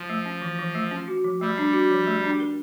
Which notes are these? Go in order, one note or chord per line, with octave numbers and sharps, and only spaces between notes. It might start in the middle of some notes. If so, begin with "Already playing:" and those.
Already playing: F3
A3
C#4
E3
E3
A3
C#4
F#4
F3
G3 A3
D4
F#4
F3
A3
D4
A#4